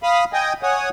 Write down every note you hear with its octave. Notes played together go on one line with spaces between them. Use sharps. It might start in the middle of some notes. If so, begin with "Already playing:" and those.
F5 B5 D#6
D#5 G5 G#5 D#6
C#5 F#5 G#5 D#6